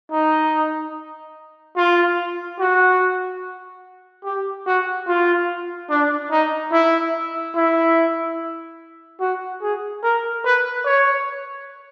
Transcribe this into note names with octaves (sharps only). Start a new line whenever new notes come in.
D#4
F4
F#4
G4
F#4
F4
D4
D#4
E4
E4
F#4
G#4
A#4
B4
C#5